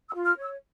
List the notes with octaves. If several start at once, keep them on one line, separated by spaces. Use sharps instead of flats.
E6
F4
F6
C#5
E6